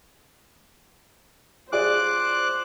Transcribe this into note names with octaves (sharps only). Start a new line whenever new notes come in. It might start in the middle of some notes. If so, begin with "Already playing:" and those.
F4 G#4 C5 D5 D6 F#6